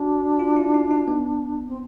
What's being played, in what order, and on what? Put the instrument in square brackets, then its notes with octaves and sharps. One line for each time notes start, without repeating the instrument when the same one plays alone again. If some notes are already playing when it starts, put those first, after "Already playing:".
Already playing: [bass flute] D4 [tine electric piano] F#4
[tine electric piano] F4
E4
D#4
D#4
B3
[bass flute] C4